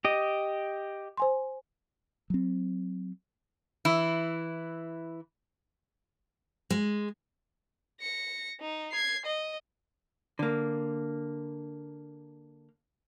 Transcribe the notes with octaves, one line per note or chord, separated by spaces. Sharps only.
G4 D#5
C5 G#5 C6
F#3 C4
E3 E4
G#3
A#6 C#7
D#4
G#6 C7
D#5
D3 A#3